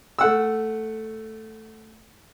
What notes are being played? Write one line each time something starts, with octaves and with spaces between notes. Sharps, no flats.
A3 F#5 E6